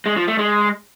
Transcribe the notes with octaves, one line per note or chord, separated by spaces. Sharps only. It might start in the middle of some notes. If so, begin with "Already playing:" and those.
G#3
F3
A3
G#3